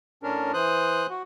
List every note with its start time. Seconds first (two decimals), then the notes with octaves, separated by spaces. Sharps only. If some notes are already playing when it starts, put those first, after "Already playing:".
0.23 A2 C#4 D4 A#4
0.54 E3 C5 D#6 F#6
1.10 F#4